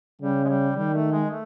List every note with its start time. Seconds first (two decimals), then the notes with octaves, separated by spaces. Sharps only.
0.22 C#3 G3
0.45 G#3
0.48 G3
0.76 D#3 G3
0.94 A3
1.12 G#3
1.30 A3